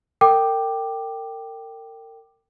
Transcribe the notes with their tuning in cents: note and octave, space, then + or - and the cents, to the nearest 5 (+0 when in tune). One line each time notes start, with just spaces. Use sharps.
A#4 -35 G5 -5 D6 +15